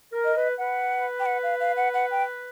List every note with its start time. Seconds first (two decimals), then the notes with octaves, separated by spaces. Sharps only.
0.13 A#4
0.24 D#5
0.35 B4
0.58 B4 F#5
1.20 G5
1.26 F#5
1.43 F5
1.60 F5
1.77 F#5
1.94 F#5
2.11 G5